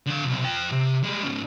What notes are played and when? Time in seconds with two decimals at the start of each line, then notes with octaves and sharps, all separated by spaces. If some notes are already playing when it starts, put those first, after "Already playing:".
0.06 D3 F5
0.24 B1 C3
0.44 F4 G5
0.72 C3
1.03 G3 G#3
1.23 G#2 C#3